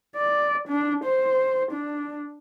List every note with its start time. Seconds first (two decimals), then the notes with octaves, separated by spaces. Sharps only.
0.16 D5
0.68 D4
1.04 C5
1.71 D4